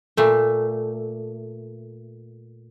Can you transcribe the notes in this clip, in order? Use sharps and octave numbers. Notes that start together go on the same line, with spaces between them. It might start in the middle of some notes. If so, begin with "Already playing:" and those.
A#2 A3